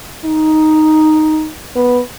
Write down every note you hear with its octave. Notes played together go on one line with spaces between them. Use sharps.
D#4
B3